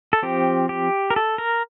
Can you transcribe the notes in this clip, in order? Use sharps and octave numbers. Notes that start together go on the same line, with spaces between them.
A4
F3 C4 G4
G4
A#4
A4
A#4